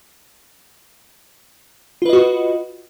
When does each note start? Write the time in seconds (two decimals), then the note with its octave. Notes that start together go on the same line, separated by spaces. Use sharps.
2.02 F4
2.06 B4
2.09 D#5
2.13 F#4